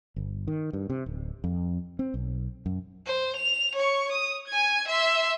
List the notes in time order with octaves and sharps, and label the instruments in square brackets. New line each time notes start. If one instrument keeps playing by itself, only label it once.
[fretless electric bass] G1
D#3
G2
C3
D1
F2
C4
B1
F#2
[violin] C5
F7
C#5 C#6
D#6
G#5 G#6
E5 C6